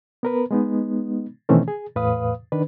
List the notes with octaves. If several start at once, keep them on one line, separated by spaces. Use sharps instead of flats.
B3 A#4 B4
G#3 B3 D#4
B2 D#3 E3 A3 C4 C#4
G#4
E2 A2 B4 F5 D#6
D#3 D4 B4